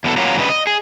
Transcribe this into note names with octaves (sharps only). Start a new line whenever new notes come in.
E2 B2 D#4 A4
F#3 A#3 B3 C#4 F4
G2 C#3 E3 G3 B4 D#5
D#5
G#4